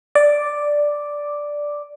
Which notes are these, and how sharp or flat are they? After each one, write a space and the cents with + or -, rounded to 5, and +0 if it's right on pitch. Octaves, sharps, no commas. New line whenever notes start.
D5 +0 D6 +0